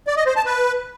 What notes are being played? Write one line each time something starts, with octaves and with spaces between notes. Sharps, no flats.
D5
D#5
C5
A5
B4